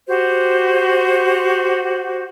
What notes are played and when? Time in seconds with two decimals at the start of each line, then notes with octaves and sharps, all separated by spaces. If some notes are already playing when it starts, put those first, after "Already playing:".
0.07 F#4 G4 C5